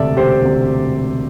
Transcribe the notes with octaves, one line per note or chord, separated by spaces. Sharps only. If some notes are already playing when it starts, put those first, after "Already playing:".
Already playing: E1 D2 C3 A4 D5 E5
E1 G4 C5
D2 C3